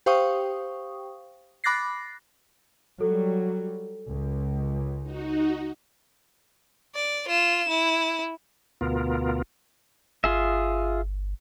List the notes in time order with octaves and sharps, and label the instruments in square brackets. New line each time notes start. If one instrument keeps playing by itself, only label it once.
[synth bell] G4 C5 F5 G5 C#6 D#6
B5 D6 F#6 A6 A#6 C7
[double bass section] F#3 G3 [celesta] A4
[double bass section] C#2
[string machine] D#4 F#4
[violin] D5
F4 E7
E4
[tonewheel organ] D2 B2 B3 F4 A#4
[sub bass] G1 [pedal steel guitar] F4 G#4 E5